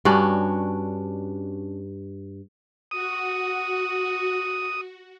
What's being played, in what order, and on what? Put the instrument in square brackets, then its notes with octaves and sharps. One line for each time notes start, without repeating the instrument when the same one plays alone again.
[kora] G2 C#4 D4 F#4
[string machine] F#4 [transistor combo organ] D#6